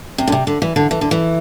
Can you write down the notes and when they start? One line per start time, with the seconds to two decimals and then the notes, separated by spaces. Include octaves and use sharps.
0.18 C3
0.27 D3
0.32 C3
0.47 D3
0.62 E3
0.76 D3
0.91 E3
1.01 D3
1.11 E3